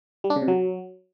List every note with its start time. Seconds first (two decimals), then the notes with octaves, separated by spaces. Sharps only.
0.24 G3
0.30 D4
0.36 C#3
0.42 C3
0.48 F#3